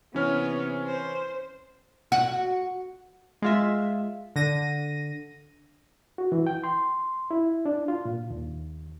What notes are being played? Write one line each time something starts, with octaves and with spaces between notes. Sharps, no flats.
C3 E3 B3 C#4 C#5 F6
C5
F#4
G#3 F4 E5
D3 A#6 D#7
F#4
E3
G5
C6
E4
D4
F4
A#2
D#2